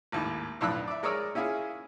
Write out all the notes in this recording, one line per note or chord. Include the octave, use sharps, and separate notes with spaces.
G#1 D#2 A2
B1 F2 A2 D4 E6 F#6
D5 E5
G#3 A#4 C#5 D5 D#6 E6
C#4 E4 F4 G#4